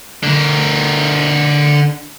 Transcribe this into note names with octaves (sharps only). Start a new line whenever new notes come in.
D3 A#4